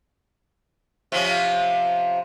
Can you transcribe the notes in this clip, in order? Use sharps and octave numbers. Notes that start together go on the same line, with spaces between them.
C3 F3 C#4